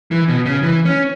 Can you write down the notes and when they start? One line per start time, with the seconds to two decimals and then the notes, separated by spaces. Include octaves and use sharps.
0.11 E3
0.28 B2
0.46 C#3
0.63 E3
0.85 C#4